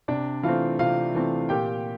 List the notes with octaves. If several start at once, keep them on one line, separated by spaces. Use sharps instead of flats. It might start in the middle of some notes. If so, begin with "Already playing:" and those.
C3 D4 D5
E3 A3 C4 F4 F5
C3 F4 F5
E3 A3 C4
A#2 G4 G5